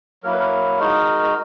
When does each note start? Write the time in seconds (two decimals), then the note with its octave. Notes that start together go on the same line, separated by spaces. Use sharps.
0.23 F#3 A#3 E4 A#4
0.32 B4
0.40 A#4
0.79 G#3 D#4 F#4
1.23 A#4